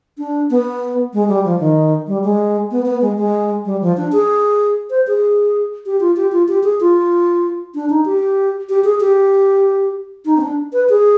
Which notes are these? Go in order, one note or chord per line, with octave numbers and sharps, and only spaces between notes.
D4
B3
G#3
G3
F3
D#3
G3
G#3
B3
B3
G#3
G#3
G3
F3
D4
G#4
C5
G#4
G4
F4
G4
F4
G4
G#4
F4
D4
D#4
G4
G4
G#4
G4
D#4
C4
D4
B4
G#4